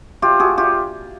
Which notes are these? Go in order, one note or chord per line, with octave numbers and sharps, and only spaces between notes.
F4 G4
F#4 G#4
F4 G4